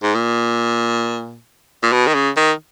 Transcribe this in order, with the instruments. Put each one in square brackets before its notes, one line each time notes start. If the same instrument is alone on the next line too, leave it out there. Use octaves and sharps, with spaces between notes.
[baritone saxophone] G#2
A#2
A#2
B2
D#3
C#3
D#3